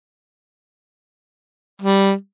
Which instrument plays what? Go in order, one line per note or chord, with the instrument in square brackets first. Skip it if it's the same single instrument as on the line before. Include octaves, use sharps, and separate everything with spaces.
[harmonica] G3